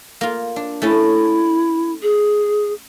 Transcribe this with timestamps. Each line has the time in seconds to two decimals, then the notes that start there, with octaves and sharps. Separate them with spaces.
0.21 A#3 F4
0.56 D4
0.82 A3 C#4 E4 A5
2.02 G#4